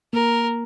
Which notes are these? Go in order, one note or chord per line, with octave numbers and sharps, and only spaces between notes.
A#3 A#4